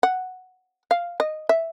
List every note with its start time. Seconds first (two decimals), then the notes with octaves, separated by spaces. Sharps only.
0.03 F#5
0.91 F5
1.20 D#5
1.49 E5